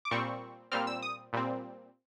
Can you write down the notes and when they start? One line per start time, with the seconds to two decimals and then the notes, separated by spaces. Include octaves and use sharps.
0.05 D6
0.11 A#2 G3 C4 C#6
0.72 A#2 G3 C4 F6
0.87 E6
1.02 D#6
1.33 A#2 G3 C4